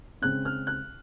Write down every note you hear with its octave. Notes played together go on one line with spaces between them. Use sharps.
C#3 G#3 C4 F#6
F6
F#6